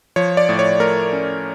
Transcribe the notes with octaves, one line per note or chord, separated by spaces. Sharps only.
F3 C#5
D5
A2
C#5
A3 A#4
C#4